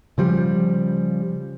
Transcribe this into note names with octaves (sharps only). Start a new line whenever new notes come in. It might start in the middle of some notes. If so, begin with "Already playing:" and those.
C#3 F3 G3